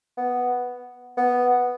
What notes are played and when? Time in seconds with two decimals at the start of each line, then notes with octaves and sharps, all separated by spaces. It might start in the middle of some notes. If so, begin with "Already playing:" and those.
0.17 B3
1.17 B3